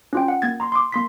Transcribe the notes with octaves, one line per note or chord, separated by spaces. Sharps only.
C#4 F4 G5
F#5
A#3 G#6 A6
A#5 C6
C6 D6
A#3 C6 B6